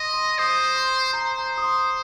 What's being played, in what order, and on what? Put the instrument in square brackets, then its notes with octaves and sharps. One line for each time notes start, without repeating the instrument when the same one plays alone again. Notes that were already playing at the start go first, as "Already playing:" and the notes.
Already playing: [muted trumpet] D#5 [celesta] C6 D#6
[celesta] C6
[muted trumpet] C5 [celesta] D#6
[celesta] C6
[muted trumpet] C5 [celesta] A#5
[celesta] A#5
D#6
C6